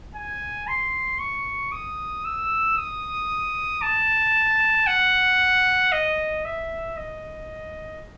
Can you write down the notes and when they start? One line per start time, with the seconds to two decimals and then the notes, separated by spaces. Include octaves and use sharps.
0.15 G#5
0.68 C6
1.19 C#6
1.72 D#6
2.25 E6
2.77 D#6
3.82 A5
4.87 F#5
5.92 D#5
6.45 E5
6.97 D#5